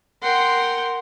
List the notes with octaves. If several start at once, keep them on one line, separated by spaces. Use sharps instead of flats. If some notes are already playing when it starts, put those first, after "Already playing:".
A#4 F#5 G5 C6